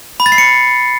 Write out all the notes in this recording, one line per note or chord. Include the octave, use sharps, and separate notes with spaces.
B5
A6
C7
C#7